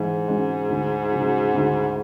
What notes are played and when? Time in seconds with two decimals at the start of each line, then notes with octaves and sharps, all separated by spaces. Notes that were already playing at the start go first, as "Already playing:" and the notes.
Already playing: G#2 E3
0.28 G#3 C#4 F#4
0.70 D2
1.12 C#3 F#3
1.54 D2